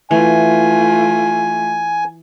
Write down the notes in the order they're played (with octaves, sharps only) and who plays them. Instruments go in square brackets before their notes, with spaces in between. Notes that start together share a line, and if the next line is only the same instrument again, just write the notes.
[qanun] E3 [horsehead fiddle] A3 F4 [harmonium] G#5